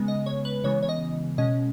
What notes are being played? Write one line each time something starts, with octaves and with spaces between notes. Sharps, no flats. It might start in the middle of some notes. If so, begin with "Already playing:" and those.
Already playing: C#3 G#3 B3
D#5
C#5
B4
C#3 E3 G#3 B3 C#5
C#5
D#5
B2 G#3 C#4 D#5